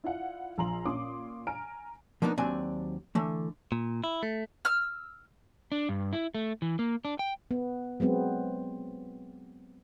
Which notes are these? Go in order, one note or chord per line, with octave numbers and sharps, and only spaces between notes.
E4 F4 D5 F5 F#5
A#1 F3 A#5 C6 F#7
A#2 C#4 C6 D6 D#6
G#5 A#5 F6 D7
F3 A#3 B3 D4 D#4
D#2 F#3 C4 D4 D5 G#5
D3 E3 A3
A#2
E4
A3
E6 F6
D4
G2
E4
A3
E3
A#3
D4
G5
B3
F#3 G#3 B3 C4